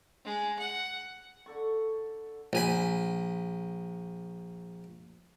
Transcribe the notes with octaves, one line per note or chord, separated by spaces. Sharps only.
G#3
F#5
D3 A4 C#6
A#1 G#5 B5